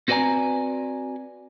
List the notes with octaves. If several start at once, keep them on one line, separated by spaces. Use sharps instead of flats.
C4 F#4 B4 D5 G#5 A#5